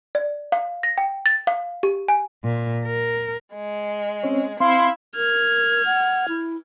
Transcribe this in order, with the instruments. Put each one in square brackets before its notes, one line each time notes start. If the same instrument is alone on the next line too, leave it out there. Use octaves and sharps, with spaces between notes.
[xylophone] D5
F5
A#6
G5
A6
F5
G4
G#5
[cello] A#2
A#4
[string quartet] G#3
[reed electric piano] C4 C#4 C#5
[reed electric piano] C4 [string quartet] E4 [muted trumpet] F5 [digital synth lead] C6
[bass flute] A#4 [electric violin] F6 G#6
[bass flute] F#5
E4